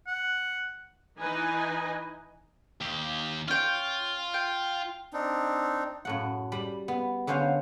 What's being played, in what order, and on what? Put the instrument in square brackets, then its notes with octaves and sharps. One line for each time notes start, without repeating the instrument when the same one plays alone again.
[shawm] F#5
[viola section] E3 D#4 B4 D#5 G#5
[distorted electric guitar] D#2 G4
[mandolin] C#4 G5 [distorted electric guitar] F4
[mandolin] G5
[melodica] C4 D4 D#4
[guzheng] F#2 A2 F#5
G3 B5
B3
D3 B3 C#4 C5 F5